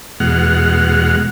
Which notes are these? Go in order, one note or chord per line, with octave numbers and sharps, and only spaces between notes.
E2 B2 G#3 F#5 F6